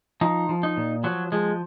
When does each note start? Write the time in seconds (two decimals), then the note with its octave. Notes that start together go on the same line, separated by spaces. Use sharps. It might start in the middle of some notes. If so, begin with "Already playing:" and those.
0.21 F3 D#4
0.49 F3
0.63 D#4
0.77 A#2
1.04 F3 F#3
1.32 F3 G#3